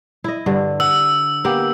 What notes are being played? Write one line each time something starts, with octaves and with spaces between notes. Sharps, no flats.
E4 D#5
G2 D3
F#5 E6
A#3 B3 G4